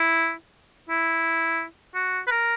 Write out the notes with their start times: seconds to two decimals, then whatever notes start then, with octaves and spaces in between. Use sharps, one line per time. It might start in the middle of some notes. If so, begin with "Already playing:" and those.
Already playing: E4
0.89 E4
1.95 F#4
2.27 B4
2.31 A#4